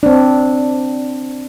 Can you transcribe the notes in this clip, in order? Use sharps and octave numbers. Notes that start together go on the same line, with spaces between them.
C4 D4